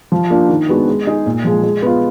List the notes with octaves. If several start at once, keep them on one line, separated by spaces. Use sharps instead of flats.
F3
A#3 D4 F4
D#3
G#3 B3 D4 F#4
G#3
D#4 G#4
A#2
F3 G#3
G#3
B3 F4